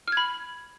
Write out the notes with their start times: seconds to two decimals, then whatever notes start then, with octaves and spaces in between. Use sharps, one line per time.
0.08 F6
0.12 G#6
0.17 B5